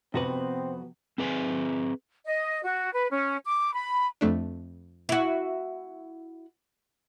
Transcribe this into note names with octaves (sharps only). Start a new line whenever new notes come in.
F2 C3 B3 C4 F#4 B4
C4 G#4 B4 F#5 G#5
D#5
F#4
B4
C#4
D6
B5
F2 A3 D4
E4 F#4